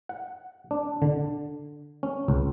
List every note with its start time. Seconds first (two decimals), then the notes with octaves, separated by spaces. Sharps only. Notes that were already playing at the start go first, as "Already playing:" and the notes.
0.09 F#5
0.71 D4
1.02 D3
2.03 C#4
2.28 C#2